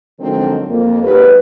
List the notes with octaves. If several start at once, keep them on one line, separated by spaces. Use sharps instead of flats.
D3 D#3 F3 F#3 G#3 C4
F2 A#3
D#2 F#3 G#3 G4 B4